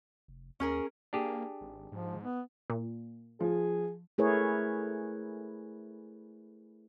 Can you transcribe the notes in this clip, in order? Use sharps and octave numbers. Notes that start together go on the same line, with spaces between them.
F1
D#2 C#4 G#4 A#4
A#3 D4 G4 G#4
G#1
G#2 F3
B3
A#2
F3 G#4
A3 E4 G#4 A#4 B4 C#5